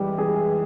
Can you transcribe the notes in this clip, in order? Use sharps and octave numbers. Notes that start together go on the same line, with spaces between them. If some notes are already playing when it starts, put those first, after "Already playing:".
Already playing: E3 G3 G#3
G#4